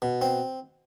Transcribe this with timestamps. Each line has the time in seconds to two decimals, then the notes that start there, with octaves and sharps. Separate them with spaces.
0.02 B2
0.22 C4